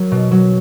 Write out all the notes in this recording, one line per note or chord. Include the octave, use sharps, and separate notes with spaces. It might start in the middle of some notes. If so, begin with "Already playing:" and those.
Already playing: F#3 A#4
B2
F#3